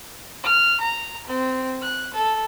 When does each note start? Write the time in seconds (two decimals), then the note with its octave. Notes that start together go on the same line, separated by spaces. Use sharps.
0.44 F6
0.81 A#5
1.27 C4
1.82 F#6
2.14 A4